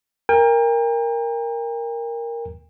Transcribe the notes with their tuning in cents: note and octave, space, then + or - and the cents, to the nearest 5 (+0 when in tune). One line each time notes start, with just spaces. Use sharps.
A#4 +0 G5 +40